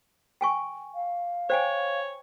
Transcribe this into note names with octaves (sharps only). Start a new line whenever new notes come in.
G5 G#5 C#6
F5
C5 C#5 G5 G#5